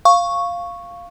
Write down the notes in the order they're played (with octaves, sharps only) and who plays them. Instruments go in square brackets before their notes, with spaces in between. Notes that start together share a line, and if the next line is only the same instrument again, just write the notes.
[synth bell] F5 C#6